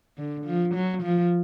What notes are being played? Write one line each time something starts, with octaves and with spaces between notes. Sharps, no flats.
D3
F3
F#3
F3